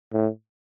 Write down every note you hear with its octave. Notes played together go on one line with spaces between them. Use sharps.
A2